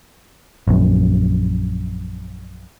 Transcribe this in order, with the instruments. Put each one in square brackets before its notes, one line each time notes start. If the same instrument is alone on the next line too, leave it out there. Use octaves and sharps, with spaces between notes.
[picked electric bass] A#1 F#2